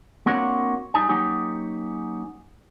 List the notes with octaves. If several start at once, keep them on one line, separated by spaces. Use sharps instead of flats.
A#3 C4 D4 F#4 A#4 C#5
G3 D#4 G#5
F#3 A#3 C#4 D#4 G4